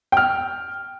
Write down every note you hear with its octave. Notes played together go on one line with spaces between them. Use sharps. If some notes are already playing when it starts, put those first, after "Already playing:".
G5 F6